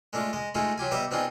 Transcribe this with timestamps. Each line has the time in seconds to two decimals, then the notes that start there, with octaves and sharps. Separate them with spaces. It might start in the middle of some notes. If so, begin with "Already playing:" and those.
0.13 G#3 A3 D4 F4
0.33 G#3 D#5
0.55 G#3 A3 D#4 F4 F#4 G#4
0.78 F#3 F4 G4 G#5
0.91 B2 G3 G4 E5 A#5 D#6
1.11 B2 C4 D4 D#4 F4 G#4